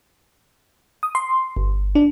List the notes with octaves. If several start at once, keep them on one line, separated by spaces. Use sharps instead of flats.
D#6
C6
G1
D4